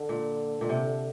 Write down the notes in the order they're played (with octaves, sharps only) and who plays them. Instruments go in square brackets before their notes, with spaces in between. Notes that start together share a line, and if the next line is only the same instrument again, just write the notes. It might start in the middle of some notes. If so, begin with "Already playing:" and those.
Already playing: [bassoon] D3
[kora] A#2
A#2
C3